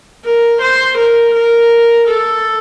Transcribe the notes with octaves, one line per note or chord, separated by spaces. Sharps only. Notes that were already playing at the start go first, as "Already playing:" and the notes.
A#4
C5
A#4
A#4
A4